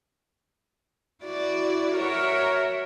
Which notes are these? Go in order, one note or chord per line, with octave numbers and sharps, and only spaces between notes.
E4 F#4 D5
F#4 A#4 C#5 E5